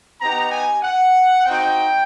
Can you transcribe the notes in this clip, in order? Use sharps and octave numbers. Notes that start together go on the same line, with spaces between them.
B3 D#4 G4 A#5
G#5
F#5
C4 D#4 F#4 G5